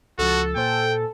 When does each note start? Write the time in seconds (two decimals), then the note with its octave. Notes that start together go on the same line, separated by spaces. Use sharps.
0.19 C#2 C#3 F3 F#4 A4
0.56 A#2 C5 G5 G#5